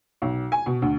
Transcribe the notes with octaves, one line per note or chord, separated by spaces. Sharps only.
B1
G#5
B2
D2